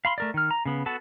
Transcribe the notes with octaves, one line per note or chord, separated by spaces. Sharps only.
F5 B5 C6
A3 A#4 D5
D#3 F6
A#5
C#3 B3
B3 F#4 A4 A5